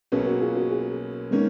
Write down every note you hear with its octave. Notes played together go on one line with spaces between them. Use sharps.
B1 B2 F#3 A#3 C#4 G#4 B4
F#4 A#4
F4 G#4
F#4 A#4
F4 G#4
D#3 G#3 A#3 B3 C#4